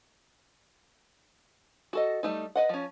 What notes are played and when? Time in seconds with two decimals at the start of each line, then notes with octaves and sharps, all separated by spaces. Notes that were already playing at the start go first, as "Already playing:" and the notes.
1.93 F#4 A4 D#5
2.23 G3 A3 D#4
2.55 B4 D#5 F#5
2.69 F3 C#4